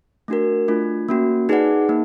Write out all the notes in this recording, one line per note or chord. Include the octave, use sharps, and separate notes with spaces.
A3 D4 F#4 A#4
A3 D4 F4
A#3 C#4 F#4
D#4 G#4 B4 D5 F#5
A#3 D#4